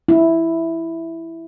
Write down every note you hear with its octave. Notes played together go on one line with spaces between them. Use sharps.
E4